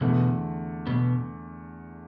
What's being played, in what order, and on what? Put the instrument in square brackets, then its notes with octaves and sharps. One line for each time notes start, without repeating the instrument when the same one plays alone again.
[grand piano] E2 D3 A3 [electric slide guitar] B2 B3
[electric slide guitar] B2 B3